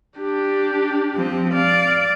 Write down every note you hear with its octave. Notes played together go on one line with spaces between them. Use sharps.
D4 G4
F3 C4
D5 F5